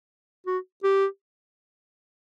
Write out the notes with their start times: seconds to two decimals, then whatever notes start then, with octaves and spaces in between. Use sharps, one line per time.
0.47 F#4
0.84 G4